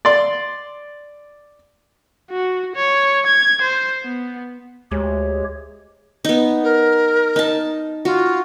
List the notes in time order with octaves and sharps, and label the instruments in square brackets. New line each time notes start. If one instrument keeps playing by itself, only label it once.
[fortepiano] D5 C6
[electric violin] F#4
C#5
G#6
C5
B3
[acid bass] D2 [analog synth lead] G#3 [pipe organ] G4 C#5
[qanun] B3 D#4
[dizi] A#4
[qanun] D#4 A5
[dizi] F4 [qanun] F#4